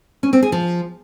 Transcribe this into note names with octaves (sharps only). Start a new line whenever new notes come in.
C#4
C4
G#4
F3